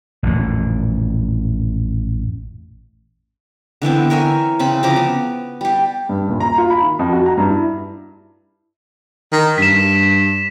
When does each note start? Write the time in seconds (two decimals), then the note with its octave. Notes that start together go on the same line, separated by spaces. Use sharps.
0.23 A1 F2 A#2
3.82 D3 E3 B3 C4
4.10 A#4 C#5 E5 G#5
4.59 C#3 C4 B5
4.83 C#3 F3 A#5 D6
4.96 B3
5.61 G3 G4
6.09 G2
6.28 D#1
6.40 A#5
6.58 F4
6.70 B5
6.82 D#3
6.99 F2
7.13 F#4
7.26 A#5
7.37 G2
7.50 E4
9.32 D#3
9.58 G2 B6 E7